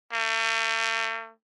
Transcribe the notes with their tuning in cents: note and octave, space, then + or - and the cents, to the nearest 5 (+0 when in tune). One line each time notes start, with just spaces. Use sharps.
A3 +45